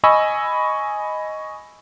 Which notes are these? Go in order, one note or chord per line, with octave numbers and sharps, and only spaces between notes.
D#5 G#5 B5 C#6 E6